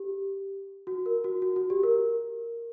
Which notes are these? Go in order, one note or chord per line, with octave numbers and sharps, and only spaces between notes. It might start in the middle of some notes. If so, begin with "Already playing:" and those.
Already playing: G4
F#4
A#4
F#4
F#4
F#4
G4
A#4